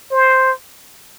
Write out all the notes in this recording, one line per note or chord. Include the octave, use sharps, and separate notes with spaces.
C5